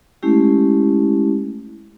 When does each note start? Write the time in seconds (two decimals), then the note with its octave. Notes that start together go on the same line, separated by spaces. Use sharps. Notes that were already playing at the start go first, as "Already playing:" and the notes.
0.23 G#3 A3 C#4 E4 G4